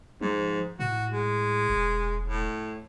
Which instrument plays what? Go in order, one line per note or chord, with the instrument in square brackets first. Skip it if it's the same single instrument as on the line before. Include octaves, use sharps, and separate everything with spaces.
[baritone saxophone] G#2 [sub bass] F3
[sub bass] A2 [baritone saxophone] F#4
[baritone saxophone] G#3
[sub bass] E1
[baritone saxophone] A2